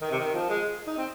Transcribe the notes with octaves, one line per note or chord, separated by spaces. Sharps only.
D#3
C3
D#3
F3
G#3
D#4
C4